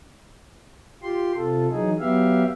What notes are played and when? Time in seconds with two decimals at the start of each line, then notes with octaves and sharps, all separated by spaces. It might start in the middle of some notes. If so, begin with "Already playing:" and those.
1.03 F4 G4 C6
1.36 C3 F4 A4
1.70 E3 F#3 D#4 G#4
2.00 F#3 B3 G4 E5 F5